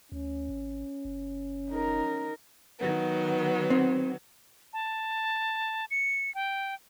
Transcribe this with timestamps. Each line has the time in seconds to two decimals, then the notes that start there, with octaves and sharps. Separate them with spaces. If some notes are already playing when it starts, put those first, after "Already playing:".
0.12 D2 C#4
0.49 G#1
1.05 F#1
1.70 D#4 A#4
2.79 D#3 F#3 B3
3.70 C4
4.73 A5
5.91 C#7
6.35 G5